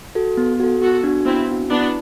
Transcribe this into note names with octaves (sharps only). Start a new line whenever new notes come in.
F#4 A4
B3
F#4 A4
B3 F#4 A4
D4 F#4
B3 C4 E4
D4 F#4
B3 D4 E4